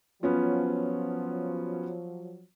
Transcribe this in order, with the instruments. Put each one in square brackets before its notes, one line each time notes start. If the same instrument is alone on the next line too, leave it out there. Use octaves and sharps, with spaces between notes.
[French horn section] F3 F#3 [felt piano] B3 C#4 F4